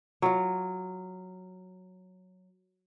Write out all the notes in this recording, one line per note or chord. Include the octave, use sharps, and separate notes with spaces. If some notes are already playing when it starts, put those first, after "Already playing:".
F#3 F4